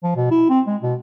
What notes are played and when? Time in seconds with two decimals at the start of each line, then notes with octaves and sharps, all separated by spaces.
0.03 F3
0.16 B2
0.31 E4
0.49 C4
0.67 G#3
0.82 B2